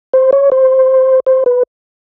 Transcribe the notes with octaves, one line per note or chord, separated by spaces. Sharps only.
C5
C#5
C5
C5
B4